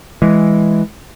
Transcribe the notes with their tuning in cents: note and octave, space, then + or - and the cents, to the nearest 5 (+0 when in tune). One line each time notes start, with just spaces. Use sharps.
E3 +5 G#3 +0